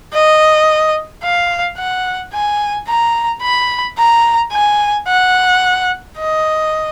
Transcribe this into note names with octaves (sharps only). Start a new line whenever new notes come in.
D#5
F5
F#5
G#5
A#5
B5
A#5
G#5
F#5
D#5